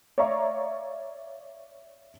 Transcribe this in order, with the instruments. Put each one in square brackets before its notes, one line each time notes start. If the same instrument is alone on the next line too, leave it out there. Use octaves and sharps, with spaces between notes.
[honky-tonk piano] C#5 D5 E5 F5 A#5 C#6